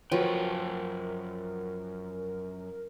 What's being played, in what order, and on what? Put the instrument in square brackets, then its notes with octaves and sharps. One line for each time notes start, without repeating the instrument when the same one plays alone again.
[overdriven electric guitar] F#2 G5 [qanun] F3 [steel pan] F#4 B4 C#5 [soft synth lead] A#4